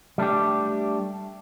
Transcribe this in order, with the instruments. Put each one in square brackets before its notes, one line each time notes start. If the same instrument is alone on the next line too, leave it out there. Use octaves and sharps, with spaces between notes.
[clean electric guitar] G3 A3 D4 G4